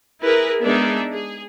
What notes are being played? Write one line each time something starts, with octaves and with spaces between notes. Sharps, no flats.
E4 G#4 A#4 B4
G#3 B3 D4 D#4 G#4 E5
G#4